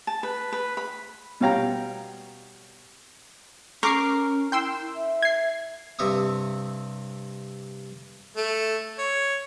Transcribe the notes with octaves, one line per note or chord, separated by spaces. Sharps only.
A5
B4
B4
B5
B2 G3 C#5 F5 G5 A#5
C#4 A#4 C#6 D6 C7
E4 G5 C6 E6
E5
G#6 C7
G2 C3 C4 E5 C#6 D#6
A3
C#5